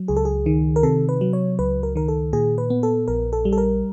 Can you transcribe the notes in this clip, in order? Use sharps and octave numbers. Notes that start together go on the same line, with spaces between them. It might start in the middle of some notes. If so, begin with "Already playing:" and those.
Already playing: F#3
C#2 G#4
A4
G#4
D#3
A#4
C3 A4
B4
F#3
C#5
C#2 B4
A#4
D#3 A#4
A4
A#2 G#4
B4
B3
A4
A#1 A#4
A4
G3
A4
A#4